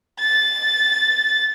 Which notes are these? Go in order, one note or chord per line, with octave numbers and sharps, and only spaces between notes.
A6